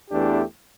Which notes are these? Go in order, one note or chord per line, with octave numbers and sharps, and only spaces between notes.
E2 E3 A3 D4 G4